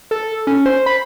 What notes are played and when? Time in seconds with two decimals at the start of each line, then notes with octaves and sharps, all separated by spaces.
0.11 A4
0.47 C#4
0.66 C5
0.86 B5